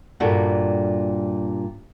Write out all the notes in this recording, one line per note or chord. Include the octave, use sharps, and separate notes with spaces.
G2 A#2 G3 F#4 A4